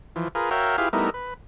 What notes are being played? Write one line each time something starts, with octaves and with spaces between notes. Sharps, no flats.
E3 F3
F4 G#4 A#4 B4
F#4 A#4 C#5 E5 F5 G5
E4 F4 G4 G#4 B4 F5
G3 A3 B3 D#4 E4 A#4
B4